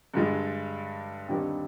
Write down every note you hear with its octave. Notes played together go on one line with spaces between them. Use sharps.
G2 D3 G#3
D#2 D3 G3 C4 D#4